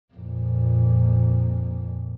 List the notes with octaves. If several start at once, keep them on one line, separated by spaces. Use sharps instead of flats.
F2 A#2